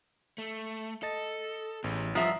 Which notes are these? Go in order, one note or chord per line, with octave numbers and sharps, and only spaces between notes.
A3
A4 D#5 A6
A1 E2
G2 F3 E5 F#5 A#5 D#6